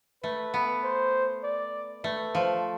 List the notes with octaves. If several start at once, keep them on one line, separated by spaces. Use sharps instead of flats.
A3 B4
B3
C5
D5
A3 B4
F3